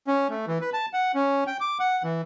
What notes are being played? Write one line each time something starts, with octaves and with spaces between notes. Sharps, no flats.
C#4
A3
E3
B4
A5
F#5
C#4
G5
D6
F#5
E3